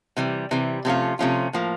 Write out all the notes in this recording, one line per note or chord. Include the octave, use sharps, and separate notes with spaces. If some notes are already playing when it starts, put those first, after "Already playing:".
C3 E3 G3
C3 E3 G3
C3 F3 A3 C#4 F4
C3 F3 A3 C#4 F4
A2 F3 A#3